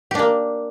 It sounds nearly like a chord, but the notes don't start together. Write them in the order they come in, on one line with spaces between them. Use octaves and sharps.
G4 D4 A#3